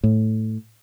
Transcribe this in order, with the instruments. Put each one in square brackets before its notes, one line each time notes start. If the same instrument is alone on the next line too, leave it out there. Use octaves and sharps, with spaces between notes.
[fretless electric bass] A2